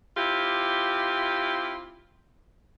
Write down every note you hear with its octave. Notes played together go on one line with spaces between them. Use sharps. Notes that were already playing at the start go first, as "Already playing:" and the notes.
C4 E4 F4 G4